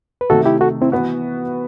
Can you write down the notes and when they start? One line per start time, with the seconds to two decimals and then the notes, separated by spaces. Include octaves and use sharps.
0.21 B4
0.30 C3 D#3 A3 F#4 A4
0.46 E4 G4
0.61 F#4 A4
0.82 C4 E4
0.92 E3 B3 F#4